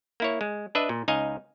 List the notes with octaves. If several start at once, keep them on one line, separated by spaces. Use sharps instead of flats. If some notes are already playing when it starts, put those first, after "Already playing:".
A#3 E4 C#5
G#3
D4 B4 D#5 E5
A#2
C#2 D#4 D#5 F5 G#5